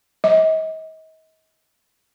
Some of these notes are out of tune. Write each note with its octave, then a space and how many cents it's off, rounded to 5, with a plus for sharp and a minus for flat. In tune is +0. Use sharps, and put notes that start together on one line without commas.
D#5 +35